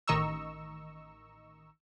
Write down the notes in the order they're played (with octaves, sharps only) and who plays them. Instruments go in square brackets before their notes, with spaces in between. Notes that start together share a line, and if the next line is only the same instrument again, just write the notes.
[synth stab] A1 D#3 D#5 A#5 C#6 E6